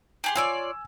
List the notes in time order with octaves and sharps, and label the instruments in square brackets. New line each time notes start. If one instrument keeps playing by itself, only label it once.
[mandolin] G4 G#4 C6
[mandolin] F4 C#5 D5 [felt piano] G#5 E6